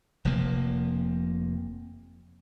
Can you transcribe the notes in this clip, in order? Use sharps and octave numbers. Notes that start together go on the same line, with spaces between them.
F1 C3 F3 A#3